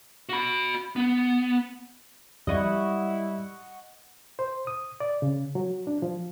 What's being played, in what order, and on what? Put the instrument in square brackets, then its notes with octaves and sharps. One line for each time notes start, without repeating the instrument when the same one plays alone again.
[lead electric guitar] F#4 B5
B3
[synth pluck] F2 D#6 [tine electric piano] G3 [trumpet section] E4 [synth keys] D#5 F#5 C#6
[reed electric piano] C5
D#6
D5
C#3
F#3
D4
F3